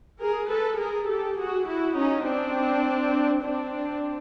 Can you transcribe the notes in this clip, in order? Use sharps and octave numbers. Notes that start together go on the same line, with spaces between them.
G#4 A#4
A4 B4
G#4 A#4
G4 A4
F#4 G#4
E4 F#4
C#4 D#4
C4 D4
C4 D4